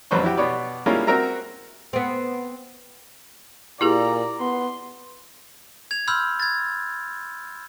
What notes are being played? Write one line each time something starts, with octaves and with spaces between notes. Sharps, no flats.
A1 F2 F#3 B4 C5 C#6
E4 F#4 G4
B2 B3 C#5 D5
G3 G#3 A#3 C#4 E4 F4
C4 F#4 A#4 E5 A#5
B3 C4
A#2 E4 G4 G#4 D5 A#5
B3 C6
G#6 F7
B5 C6 E6 F6 G6
G#6 A6